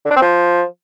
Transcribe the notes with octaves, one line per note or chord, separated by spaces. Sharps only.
D3
D4
C4
F3